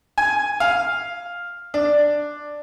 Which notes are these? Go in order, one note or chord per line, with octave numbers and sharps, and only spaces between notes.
G#5
F5
D4